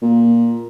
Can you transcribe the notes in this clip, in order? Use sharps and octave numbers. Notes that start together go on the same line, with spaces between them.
A#2